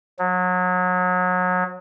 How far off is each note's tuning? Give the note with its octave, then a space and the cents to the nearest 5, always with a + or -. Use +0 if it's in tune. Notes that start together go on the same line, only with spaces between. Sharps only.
F#3 -30